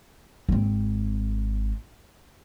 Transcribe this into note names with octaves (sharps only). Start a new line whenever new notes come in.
G#1 C4